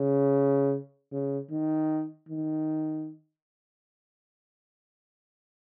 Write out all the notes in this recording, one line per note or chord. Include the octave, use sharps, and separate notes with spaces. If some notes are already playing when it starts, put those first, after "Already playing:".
Already playing: C#3
C#3
D#3
D#3